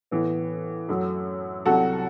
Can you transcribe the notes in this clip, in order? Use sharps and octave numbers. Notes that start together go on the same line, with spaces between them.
A2 E3 B3
F#2 F#3 A3
C2 C3 F#3 F#4 A4